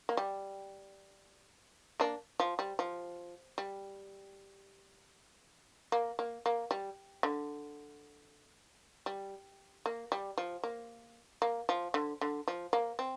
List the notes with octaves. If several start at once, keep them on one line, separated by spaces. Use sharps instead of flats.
A#3
G3
A#3 D4
F3
G3
F3
G3
A#3
A#3
A#3
G3
D3
G3
A#3
G3
F3
A#3
A#3
F3
D3
D3
F3
A#3
C4